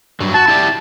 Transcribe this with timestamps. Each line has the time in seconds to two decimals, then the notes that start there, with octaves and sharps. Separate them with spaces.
0.20 G2 F#3
0.34 F#4 A5
0.48 E4 G4 D5